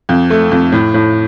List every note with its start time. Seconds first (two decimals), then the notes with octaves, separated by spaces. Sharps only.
0.09 F2
0.30 A3
0.52 F2
0.72 A2
0.94 A2